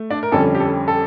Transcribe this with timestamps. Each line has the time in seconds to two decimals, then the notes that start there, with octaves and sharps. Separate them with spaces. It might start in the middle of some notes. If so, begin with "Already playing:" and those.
Already playing: A3
0.10 D4 D5
0.23 A#4
0.32 F2 D3 G3 C#4 A4
0.55 G4
0.60 A4
0.88 A4